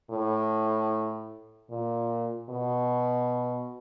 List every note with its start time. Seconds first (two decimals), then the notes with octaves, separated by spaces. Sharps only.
0.11 A2
1.70 A#2
2.50 B2